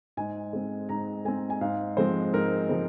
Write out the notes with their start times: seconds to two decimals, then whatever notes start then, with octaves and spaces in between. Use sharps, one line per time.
0.17 G#2 G#5
0.53 G#3 C4
0.89 G#2 A#5
1.25 G#3 C4 G#5
1.50 G#5
1.61 G#2 F5
1.97 F3 G#3 C4 C5
2.33 G#2 A#4
2.69 F3 G#3 C4